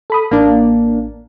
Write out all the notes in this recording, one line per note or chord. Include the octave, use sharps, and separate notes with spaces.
A4 B5 D#6
A1 A#3 D4